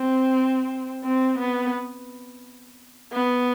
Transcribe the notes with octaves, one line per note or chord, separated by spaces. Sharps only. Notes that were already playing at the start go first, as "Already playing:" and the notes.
Already playing: C4
C4
B3
B3